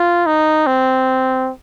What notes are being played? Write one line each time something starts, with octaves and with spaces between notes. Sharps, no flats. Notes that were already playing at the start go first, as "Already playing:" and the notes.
Already playing: F4
D#4
C4